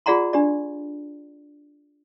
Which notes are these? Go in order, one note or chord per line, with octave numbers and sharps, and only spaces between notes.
F4 G#4 D5 F#5 A#5 C6
D4 G4 D5